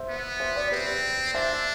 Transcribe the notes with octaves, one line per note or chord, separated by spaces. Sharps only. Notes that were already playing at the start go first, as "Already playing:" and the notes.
Already playing: C5 E5
B3
C5 E5
B4 D5
C4 G4 B4
D4 C5 E5